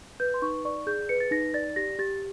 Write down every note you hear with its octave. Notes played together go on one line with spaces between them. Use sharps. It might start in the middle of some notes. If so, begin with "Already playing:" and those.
B4 G6
C6
D#4 C#6
D5 C#6
G#4 G6
B4 C#7
A6
D#4 A#6
D5 A6
G4 A#6
G4 A6